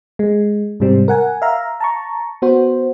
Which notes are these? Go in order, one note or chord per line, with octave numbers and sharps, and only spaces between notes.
G#3
G#2 C3 G3 C4
A#4 F#5 G#5
E5 F5 A#5
A5 A#5 C#6
B3 F#4 C5